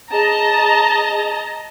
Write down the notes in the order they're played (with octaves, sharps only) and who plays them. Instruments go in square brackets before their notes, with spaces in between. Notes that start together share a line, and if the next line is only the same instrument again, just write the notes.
[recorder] G#4 [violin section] D#5 A5 A#5